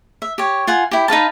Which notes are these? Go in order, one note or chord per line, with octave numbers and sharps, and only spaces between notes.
E5
G4 C#5
F4 F#5 G#5
E4 G4
D#4 B4 F5 A5